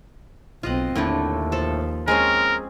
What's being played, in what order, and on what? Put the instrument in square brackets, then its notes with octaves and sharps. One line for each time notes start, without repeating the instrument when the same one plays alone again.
[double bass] B1 C4 [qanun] F4 D#5 F#5
[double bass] D#2 [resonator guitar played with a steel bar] A2 D3 A3
[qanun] F3 A4
[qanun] G#3 C4 C#4 [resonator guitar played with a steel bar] G#4 [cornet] A#4